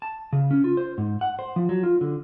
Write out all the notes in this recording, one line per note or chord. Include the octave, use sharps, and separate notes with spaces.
A5
C#3
C#4
F4
C5
G#2
F#5
C5
F3
F#3
F4
D3